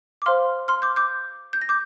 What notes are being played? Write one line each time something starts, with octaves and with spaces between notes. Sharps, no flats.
D6
C5 F5 C6 F6
C6 F6
D6 G6
D6 G6
G6
A#6
D6 G6